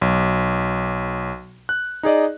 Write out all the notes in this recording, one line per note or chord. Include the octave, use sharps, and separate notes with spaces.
B1
F#6
D#4 G#4 D5 D#5